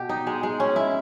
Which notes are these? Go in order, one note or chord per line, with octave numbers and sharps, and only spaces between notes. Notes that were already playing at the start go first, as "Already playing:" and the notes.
Already playing: B2 G4
D#4
G#3
G#3
C#4
E4